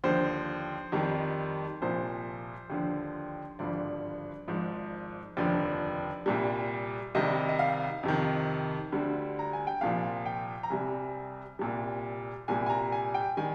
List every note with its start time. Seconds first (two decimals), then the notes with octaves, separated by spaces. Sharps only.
0.04 D#2 D3 F3 C5
0.92 F2 D#3 G3
1.81 C2 A#2 F3 C5
2.70 D#2 D3 F3
3.59 G#1 G2 D3 F3 D5
4.48 G#1 G#2 F3
5.37 F1 D#2 D3 F3 D5
6.26 C2 A#2 G3
7.15 C2 C3 D#3 G3 D#5
7.49 D#5
7.59 F5
8.03 F2 C3 D#3
8.92 D2 D3 G3
9.39 A#5
9.53 G#5
9.67 G5
9.81 C2 A#2 F3 F5
10.26 G5
10.63 A#5
10.70 C2 C3 G3 G#5
11.59 C2 A#2 G3
12.48 C2 A#2 G3 G#5
12.66 G#5
12.70 A#5
12.92 G#5
13.14 G5
13.37 D#3 G3 G#5